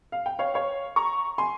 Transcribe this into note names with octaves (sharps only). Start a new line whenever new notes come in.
F5
G5
C#5 F5
C#5 F5
A#5 C#6
G#5 C6